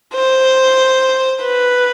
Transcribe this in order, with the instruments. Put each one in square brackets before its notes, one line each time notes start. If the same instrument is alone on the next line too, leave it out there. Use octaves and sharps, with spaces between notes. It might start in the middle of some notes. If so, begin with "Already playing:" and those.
[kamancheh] C5
B4